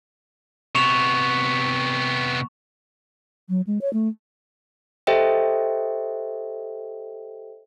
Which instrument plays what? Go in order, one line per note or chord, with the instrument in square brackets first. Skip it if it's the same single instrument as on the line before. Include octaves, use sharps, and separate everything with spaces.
[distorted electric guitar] C3 B3 [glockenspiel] C#6 E7 F7
[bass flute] F#3
G#3
C#5
A3
[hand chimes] G4 A4 C5 D#5 E5 G5